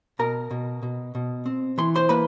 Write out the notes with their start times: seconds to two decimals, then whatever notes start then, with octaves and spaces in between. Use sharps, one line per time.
0.19 B2 A#4 A#5
0.51 B2
0.83 B2
1.15 B2
1.46 C4
1.78 E3 C6
1.96 C5 C6
2.09 A#3 B4 B5